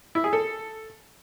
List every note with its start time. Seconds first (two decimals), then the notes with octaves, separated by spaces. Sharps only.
0.15 E4
0.24 G#4
0.33 A4